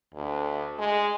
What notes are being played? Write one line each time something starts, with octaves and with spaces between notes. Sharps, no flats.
D2
G#3